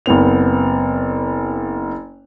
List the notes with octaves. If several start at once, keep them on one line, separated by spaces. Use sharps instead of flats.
F#1 B3 C4 F7